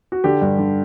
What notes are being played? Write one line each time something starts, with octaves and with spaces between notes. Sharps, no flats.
F#4
D3 G4
G2
D3